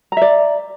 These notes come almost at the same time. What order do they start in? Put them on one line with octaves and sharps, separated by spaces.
A#5 E5 D5